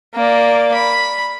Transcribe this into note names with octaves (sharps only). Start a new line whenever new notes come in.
A#3 D5
B5